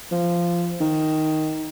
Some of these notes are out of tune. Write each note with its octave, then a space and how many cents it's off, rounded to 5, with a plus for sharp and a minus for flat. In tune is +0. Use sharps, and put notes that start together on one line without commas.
F3 -10
D#3 +0